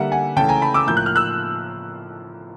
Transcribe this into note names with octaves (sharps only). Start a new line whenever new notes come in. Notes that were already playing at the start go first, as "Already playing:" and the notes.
Already playing: D3 G3 A#3 E5 F#5
F#5 G#5
C#3 E3 A3 G5 A5
G#5 A#5
A5 B5
D6 E6
A2 F3 A#3 G6
F#6
F6
E6 F#6